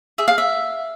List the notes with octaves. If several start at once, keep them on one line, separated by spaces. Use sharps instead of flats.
G#4 E5
F5
E5